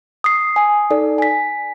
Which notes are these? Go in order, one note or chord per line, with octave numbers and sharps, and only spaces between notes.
D#6 C7
G#5 D#6
D#4 A4 D5
G#5 B6